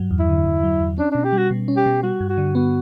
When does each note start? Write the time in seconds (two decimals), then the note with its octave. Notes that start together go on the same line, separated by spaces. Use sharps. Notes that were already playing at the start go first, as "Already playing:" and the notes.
Already playing: G2 F#3
0.11 E2
0.19 E4
0.29 D3
0.45 E2
0.63 F#3
0.81 E2
0.98 C#4 D4
1.12 B2 D4
1.24 G4
1.33 G3 F#4
1.51 B2
1.68 C#4
1.77 G4
1.86 B2
2.03 G3 F#4
2.20 G2
2.29 F#4
2.38 D3
2.55 B3 F#4